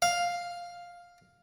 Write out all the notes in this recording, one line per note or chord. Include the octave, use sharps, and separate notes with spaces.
F5